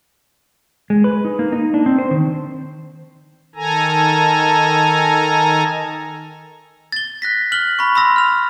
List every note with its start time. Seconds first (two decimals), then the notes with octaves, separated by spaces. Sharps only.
0.90 G#3
1.04 B4
1.25 D#4
1.39 A#3
1.52 D#4
1.74 D4
1.86 C4
1.99 C5
2.11 D#3
3.55 D#3 A4 G#5 A#5
6.92 A6 G7
7.22 F#6 A#6 B6
7.52 F6 F#6 F#7 G7
7.79 B5 C#6
7.95 B5 C6 E6 A#6
8.16 F6 F7